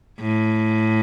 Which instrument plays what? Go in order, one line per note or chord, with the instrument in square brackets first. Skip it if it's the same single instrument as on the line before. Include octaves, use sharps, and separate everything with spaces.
[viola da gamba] A2